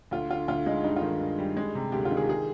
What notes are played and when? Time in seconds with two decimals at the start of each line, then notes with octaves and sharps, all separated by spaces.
0.11 D2 F4
0.31 D3 F4
0.48 D2 F4
0.66 G#3 D#4
0.84 G2 D#4
0.96 F4
1.02 D#3
1.21 G2
1.39 G3
1.57 G#3
1.75 C3
1.92 D2 G4
2.05 F4
2.11 D#3
2.17 G#4
2.29 G#4